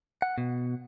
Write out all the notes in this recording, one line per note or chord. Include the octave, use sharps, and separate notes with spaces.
F#5
B2